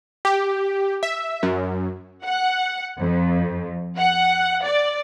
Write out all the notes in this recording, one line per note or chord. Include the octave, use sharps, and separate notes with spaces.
G4
E5
F#2
F#5
F2
F#5
D5